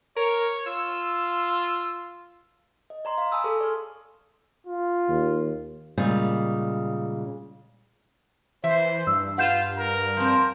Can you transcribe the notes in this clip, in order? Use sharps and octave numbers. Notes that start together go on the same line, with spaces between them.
A#4 C#5
F4 E6
D#5
D5 A#5 C6
F5
G#5 A5 B5 D#6 E6
G#4 A4 C#6 D#6
D5 C6 F6
F4
D#2
A#2 C#3 G3 G#3
E3 C5 E5
G2 E6
F4 B4 F5 F#5 G6 E7
A#4
F3 C4